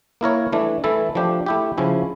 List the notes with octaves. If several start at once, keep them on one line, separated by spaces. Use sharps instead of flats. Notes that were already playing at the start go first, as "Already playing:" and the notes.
A#3 E4 A#4 C#5
E3 A3 D4
E3 A3 E4 A4
F3 A3 D4 G4
A3 E4 G4
C#3 F3 C#4 E4